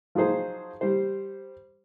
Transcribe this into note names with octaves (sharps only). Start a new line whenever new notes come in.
F3 F#3 D#4 G#4 C5
G3 C5